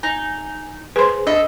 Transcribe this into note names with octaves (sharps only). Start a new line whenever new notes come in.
D#4 G#5
G#4 B4 C5 C6
D4 A4 D#5